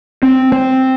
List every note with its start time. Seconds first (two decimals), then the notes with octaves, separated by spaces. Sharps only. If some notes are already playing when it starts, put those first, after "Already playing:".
0.23 C4
0.52 C4